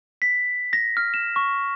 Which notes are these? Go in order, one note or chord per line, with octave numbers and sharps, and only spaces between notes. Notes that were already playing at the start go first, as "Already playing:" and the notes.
B6
A#6
F6
E7
C#6